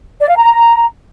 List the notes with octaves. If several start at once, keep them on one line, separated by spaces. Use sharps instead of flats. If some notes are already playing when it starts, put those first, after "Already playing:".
D5
F5
A#5